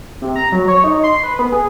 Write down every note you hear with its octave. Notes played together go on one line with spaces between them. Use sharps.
C3
A#5
F#3
C#5
D#4
C6
B4
B3
G#4